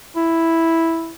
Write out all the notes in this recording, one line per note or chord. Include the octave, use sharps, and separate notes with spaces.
E4